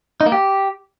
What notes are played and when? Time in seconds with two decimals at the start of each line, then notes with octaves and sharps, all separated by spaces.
0.21 D#4
0.26 A#3
0.32 G4